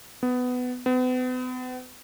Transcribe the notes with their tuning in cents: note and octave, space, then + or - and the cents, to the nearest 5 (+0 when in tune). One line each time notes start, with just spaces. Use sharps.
B3 +15
B3 +40